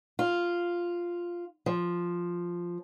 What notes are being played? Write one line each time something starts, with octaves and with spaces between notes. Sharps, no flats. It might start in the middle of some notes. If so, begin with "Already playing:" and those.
F4
F3